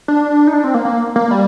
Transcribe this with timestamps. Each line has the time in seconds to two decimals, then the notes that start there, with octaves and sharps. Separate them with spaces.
0.08 D4
0.47 D#4
0.54 D4
0.64 C4
0.74 A#3
0.85 A#3
1.16 A#3
1.31 G3